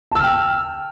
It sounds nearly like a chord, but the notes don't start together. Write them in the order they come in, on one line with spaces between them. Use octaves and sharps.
A5 E6 F6 G5